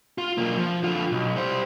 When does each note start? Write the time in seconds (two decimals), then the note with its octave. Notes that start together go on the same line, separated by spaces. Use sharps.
0.18 F4
0.38 B1 A#3
0.57 F3
0.83 D3 F4
1.12 B1
1.36 G3 C5